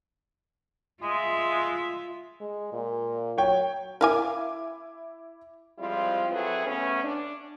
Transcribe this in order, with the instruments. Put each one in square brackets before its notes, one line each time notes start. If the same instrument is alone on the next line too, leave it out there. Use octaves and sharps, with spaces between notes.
[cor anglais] G#3 [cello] F4 E5
[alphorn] G#3
A#2
[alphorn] F#3 [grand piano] C#5 G5
[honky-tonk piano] E4 D6 [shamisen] A#4 F5 G#5
[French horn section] F3 G3 G#3 C4 E4 F4
F#3 C4 E4 G#4 A4 B4
C#3 A3 B3 C#4
D4